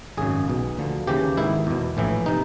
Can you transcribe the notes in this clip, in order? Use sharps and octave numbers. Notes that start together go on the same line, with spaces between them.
G#1 F#2 C#3 G#4
B1 B2
D2 D3 F3
D#2 C#3 E3 G4
G#1 G#2 D#3 E4
E2 B2
A#1 A2 E3
C3 D#4